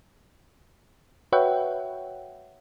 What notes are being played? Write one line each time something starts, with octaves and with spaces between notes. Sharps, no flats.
F#4 B4 C#5 E5 F#5 G5